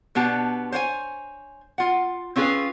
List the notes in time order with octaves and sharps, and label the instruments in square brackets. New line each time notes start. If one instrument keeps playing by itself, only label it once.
[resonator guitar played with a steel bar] B2 B3 D4 G4 A5
C5 C#5 F#5 G#5
F4 F#5
C4 C#4 F4 G#4 B4